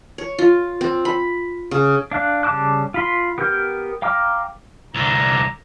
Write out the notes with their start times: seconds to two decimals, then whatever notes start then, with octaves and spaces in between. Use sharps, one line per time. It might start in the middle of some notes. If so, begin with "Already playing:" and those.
0.18 C#5
0.39 F4
0.81 C4
1.05 B5
1.71 C#3
2.11 D4 F5 F#6
2.43 C#3 G3 A5 D6 F#6
2.94 F4 B5 C6
3.38 B3 G4 A#4 F6 G6
4.02 F5 G5 A#5 D6 F6
4.95 C2 D3 A#5